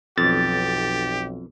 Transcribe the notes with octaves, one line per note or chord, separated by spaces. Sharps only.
B1 F2 G4 A6